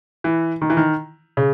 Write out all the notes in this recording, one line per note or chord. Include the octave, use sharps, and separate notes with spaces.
E3
D#3
E3
D#3
C#3